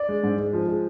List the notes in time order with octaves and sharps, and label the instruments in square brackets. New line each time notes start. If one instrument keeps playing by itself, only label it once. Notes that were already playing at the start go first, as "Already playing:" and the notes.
Already playing: [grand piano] D5
G#3
G#2
G#3
F3
G#3